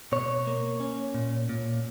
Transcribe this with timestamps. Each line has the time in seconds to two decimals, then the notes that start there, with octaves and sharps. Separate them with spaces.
0.12 B2 C#5
0.47 A#3
0.80 C#4
1.15 A#2
1.49 A#2